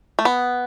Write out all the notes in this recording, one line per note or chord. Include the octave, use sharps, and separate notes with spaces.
A3
B3